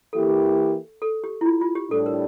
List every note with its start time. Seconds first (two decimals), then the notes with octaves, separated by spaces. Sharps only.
0.13 E3 A#3 E4 G4 A4
1.02 A4
1.24 G4
1.41 E4
1.46 F4
1.61 F4
1.75 G4
1.90 A2 G3 D4 A4
2.06 A#4